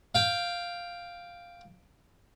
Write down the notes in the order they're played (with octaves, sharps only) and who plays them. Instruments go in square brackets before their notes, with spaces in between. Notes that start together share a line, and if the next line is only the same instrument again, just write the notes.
[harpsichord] F5 G5